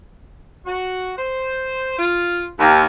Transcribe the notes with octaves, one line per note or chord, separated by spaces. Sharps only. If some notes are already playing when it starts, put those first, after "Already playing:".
F#4
C5
F4
D#2